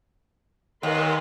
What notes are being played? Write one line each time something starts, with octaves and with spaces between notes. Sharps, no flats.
D#2 D#3 B4 C6